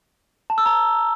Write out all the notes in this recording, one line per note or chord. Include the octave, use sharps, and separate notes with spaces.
A5
E6
A#5